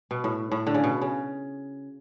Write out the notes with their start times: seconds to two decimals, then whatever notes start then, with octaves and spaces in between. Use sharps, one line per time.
0.11 B2
0.24 A2
0.52 A2
0.67 D3
0.74 C#3
0.84 B2
1.02 C#3